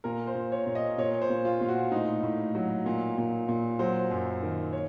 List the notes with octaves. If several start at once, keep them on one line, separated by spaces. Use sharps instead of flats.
A#2 A#4
C5
A#2
C#5
A#2
D#5
A#2 C#5
C5
A#2
F4
A#2
F#4
A2 D#4
A2
F#3
A#2
A#2
A#2
F#3 C5
F#2
D#3
C#5